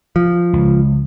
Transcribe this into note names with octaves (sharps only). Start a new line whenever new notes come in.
F3
C#2